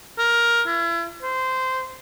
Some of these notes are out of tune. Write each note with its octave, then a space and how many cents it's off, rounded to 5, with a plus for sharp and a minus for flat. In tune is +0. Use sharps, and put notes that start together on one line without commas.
A#4 +10
E4 +40
C5 -15